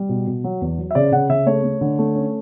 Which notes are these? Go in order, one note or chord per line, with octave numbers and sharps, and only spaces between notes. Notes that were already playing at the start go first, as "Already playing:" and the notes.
Already playing: G3
B2
B2
F#3
E2
F#3
E5
C#3 D5
C#3 F#5
C#3 E5
A3 C#5
A3
D3
A3
C#4